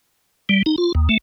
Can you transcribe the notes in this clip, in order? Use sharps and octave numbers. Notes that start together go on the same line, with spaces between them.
G3
D#4
F4
D#2
A3